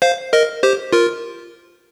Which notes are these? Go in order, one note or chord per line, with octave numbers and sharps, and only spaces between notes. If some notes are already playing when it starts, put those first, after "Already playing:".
C5 F5
A#4 D#5
G4 C5
F4 A#4